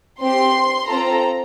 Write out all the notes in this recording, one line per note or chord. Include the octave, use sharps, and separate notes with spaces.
C4 G4 C6
C4 F4 A4 A#5